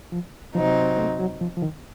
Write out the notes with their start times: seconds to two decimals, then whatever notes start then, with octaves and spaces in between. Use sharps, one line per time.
0.12 F3
0.55 C3 F3 F#3 C4 D#4
0.98 A3
1.19 F#3
1.41 F3
1.57 F3
1.62 D#3